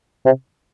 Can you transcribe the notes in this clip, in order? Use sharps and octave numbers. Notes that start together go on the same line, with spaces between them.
C3